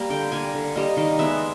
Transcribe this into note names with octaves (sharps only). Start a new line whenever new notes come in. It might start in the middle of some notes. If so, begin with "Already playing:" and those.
Already playing: G3 A#3
D3 G5
G3 A#3 G#5
D3
G3 A#3 D#5
D#3 D#5
G#3 B3 E5